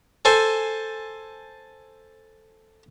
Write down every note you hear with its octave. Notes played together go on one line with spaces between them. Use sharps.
A4 C5 G#5